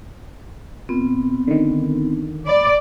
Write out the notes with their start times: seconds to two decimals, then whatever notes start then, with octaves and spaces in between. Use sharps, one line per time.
0.89 A#2 B3 C4
1.48 D3 D#3
2.47 D5 B5